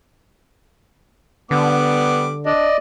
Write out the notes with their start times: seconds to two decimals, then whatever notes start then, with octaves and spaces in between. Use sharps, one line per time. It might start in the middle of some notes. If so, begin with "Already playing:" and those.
1.51 D3 G3 B3 D4 D6
2.46 D4 D5 D#5